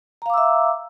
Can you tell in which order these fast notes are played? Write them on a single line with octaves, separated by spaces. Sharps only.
A#5 F5 D6 E6 E5